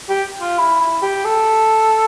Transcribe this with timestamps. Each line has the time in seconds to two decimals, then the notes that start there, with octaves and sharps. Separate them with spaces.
0.09 G4
0.41 F4
0.58 E4
0.81 E4
1.02 G4
1.25 A4